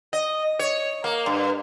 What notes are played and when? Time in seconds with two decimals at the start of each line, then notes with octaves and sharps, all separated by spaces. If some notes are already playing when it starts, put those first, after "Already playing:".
0.13 D#5
0.59 C#5
1.04 A#3
1.26 G2